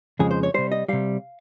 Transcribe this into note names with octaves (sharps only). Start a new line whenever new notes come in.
F2 C#3 F3 G#3 G#4
C5
C#5
C3 G3 C5
D#5
C3 G3 F5